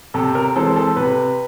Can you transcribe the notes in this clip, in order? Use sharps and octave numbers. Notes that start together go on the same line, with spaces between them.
C3 A4
A#4
E3 G#3 C4 A4
A4
C3 B4